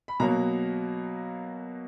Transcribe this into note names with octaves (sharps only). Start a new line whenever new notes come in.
B5
B2 F#3 A#3 A#5